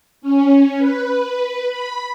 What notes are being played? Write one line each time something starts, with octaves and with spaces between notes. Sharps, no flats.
C#4
B4
B5